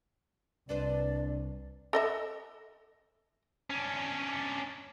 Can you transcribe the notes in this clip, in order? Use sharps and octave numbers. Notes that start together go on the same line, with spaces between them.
C2 D4 B4 C5 D5
A4 D#5 E5
C#4 D4